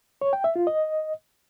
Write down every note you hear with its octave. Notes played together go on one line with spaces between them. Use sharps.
C#5
G5
E5
F4
D#5